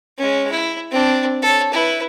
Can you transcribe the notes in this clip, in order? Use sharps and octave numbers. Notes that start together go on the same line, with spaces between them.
G#3 C#4
E4
C4 D4
A4 C#5
E4 B4